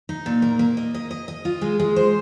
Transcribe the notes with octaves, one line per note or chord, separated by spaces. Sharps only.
D#4
A#2
A#3
A#3
D#5
D#5
D#5
D#5
F4
G#3
G#3
C5